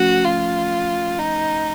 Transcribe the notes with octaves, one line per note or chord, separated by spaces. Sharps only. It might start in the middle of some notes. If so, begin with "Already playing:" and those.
Already playing: F3 A3 C#4 F#4
F4
D#4